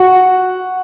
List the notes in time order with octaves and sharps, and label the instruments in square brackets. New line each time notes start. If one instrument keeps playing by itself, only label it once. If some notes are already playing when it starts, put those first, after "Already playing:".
Already playing: [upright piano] F#4 F#5